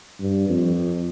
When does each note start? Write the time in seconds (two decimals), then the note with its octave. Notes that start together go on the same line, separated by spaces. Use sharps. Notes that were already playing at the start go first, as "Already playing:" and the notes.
0.20 G2
0.49 F2